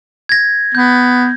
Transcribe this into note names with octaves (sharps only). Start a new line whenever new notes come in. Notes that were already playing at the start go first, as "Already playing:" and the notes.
G#6 A#6
B3 G6